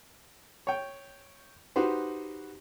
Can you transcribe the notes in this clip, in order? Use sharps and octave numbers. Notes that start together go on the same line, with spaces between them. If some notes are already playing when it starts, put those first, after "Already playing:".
C#5 G5
D#4 F#4 G4 B4 C5